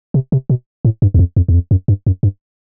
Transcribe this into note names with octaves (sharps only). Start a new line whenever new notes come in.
C3
C3
B2
A2
G2
E2
F2
F2
E2
F2
F#2
G2
F#2
G2